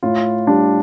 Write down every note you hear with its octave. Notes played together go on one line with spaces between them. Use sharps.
A2 F4
G3 D4